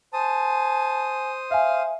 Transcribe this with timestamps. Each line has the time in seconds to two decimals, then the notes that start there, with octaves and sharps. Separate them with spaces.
0.13 C5 G#5 A5 D#6
1.51 E5 F5 G#5